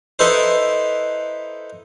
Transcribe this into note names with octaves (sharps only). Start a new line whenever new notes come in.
D#4 E4 A4 B4 C5